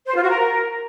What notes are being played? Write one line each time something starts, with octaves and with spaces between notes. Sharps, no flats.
C5
F4
F#4
A#4